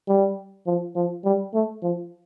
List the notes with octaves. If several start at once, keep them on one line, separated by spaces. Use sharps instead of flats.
G3
F3
F3
G3
A3
F3